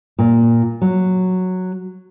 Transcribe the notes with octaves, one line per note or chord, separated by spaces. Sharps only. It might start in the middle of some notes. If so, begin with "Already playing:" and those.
A#2
F#3